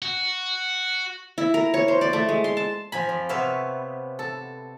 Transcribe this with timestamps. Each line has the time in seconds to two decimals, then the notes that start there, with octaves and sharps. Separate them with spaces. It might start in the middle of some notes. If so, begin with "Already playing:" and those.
0.02 F#4
1.38 E4
1.54 A#4
1.74 C#5
1.88 C5
2.01 D5
2.13 A3
2.29 G#3
2.44 C6
2.57 A5
2.92 F3 G#5 B5
3.09 F2
3.29 C3 B3 B4 C#5 E5 F5
4.19 A4